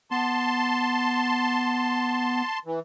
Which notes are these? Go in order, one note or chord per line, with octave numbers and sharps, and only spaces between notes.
B3 A5 C6
E3